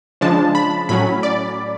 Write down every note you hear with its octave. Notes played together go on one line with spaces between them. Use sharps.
C#3 F3 G#3 D4 A5
B5
A2 F#3 C#4 B5
D5